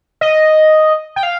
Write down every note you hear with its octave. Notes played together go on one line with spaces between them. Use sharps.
D#5
G5
F5